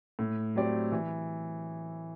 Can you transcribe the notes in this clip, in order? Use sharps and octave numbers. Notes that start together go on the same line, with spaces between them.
A2
F#3 C4 G4 D5
E3